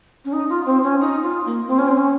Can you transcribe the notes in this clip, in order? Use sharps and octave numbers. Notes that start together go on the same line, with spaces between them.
C#4
D#4
F4
C4
C#4
D#4
F4
A#3
C4
C#4
C4
C#4